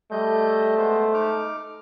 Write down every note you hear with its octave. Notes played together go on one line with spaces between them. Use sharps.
G3 A3 D#5 G6
G#3 B3 C5
D#4 D6 F6